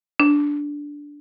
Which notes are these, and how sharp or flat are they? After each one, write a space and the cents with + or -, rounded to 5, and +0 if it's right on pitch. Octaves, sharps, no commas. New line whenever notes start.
D4 -10